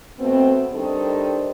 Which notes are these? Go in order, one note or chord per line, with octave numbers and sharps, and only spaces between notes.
B2 A3 B3 C4
D#3 G3 D4 D#4 A4 C5